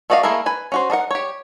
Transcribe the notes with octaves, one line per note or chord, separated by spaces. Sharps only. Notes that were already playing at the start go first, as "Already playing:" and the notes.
A3 F#4 D5 D#5 F5
A3 A#3 E4 G#4 A#4
B4 G#5
C#4 F#4 C5
D4 D#4 A#4 F#5
G4 C#5